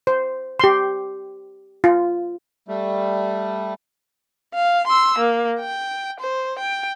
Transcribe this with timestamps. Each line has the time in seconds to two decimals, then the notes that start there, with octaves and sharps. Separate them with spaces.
0.07 C5
0.60 G4 C6
1.84 F4
2.68 G3 A3
4.54 F5
4.87 C6 E6
5.19 A#3
5.60 G5
6.20 C5
6.58 G5